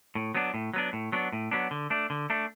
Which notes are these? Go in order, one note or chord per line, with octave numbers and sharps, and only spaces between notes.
A2
F#3 B3 D4
A2
F#3 B3 D4
A2
F#3 B3 D4
A2
F#3 B3 D4
D3
A3 D4
D3
A3 D4